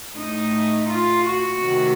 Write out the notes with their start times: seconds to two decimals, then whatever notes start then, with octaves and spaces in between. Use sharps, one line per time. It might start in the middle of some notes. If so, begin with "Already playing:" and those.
0.15 A2 A3 D#4
0.88 F4
1.25 F#4
1.62 C3 D#3 A3